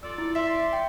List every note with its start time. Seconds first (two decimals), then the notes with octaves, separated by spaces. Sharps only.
0.03 F4 A4 D5 E6
0.18 E4
0.35 D5 E5 C6 B6
0.73 G5